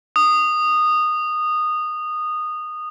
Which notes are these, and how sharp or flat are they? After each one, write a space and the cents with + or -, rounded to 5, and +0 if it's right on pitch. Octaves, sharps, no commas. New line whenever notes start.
D#6 -15